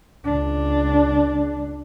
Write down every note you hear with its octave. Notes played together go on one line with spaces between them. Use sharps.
C#2 D4